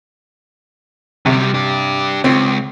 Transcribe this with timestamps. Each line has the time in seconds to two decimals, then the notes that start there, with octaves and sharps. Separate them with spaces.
1.26 F#2 C3 G3
1.54 D4 G4
2.24 C#2 C4